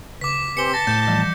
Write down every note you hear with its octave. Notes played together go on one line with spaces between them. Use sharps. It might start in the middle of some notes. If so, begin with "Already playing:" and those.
C#3 D6 B6
C4 G4 B4 G#5 C#7 G7
A5 A#6
A2 G6
E3 F3 G3